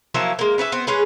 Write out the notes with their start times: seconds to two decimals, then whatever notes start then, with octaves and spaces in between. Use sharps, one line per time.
0.14 F3 F#3 A#3 E4
0.39 G#3 A#3
0.58 C#4 B4 C#5 E5
0.72 B3 C4
0.87 G#3 C#4 G#4 B4